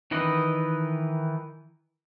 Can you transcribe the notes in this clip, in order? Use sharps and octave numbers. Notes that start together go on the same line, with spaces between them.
D#3 E3 B4 D#5